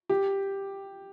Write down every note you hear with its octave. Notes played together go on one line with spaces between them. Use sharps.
G4